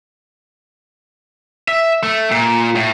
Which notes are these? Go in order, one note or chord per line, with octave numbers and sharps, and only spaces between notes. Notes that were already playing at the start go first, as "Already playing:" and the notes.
E5
A3
A#2
A2